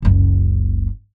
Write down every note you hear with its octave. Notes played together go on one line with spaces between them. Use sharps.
F#1 C#2